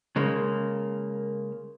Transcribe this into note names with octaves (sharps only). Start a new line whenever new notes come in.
C#3 G#3 A#3